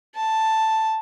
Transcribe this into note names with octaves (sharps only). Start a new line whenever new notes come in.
A5